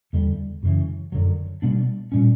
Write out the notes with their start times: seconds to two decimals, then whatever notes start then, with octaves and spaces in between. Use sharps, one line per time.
0.13 E2 D3 G3
0.63 F#2 C#3 E3
1.12 F#2 D3 F#3
1.62 B2 G3 B3 D4
2.12 A#2 G3 C#4